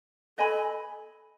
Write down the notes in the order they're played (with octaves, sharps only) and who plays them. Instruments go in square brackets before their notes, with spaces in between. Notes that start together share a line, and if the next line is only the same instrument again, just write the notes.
[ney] A4 [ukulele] B4 D#5 G#5 B5